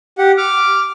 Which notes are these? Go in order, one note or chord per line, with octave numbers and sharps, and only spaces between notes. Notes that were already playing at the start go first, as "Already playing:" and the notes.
G4 F#5
D6 F6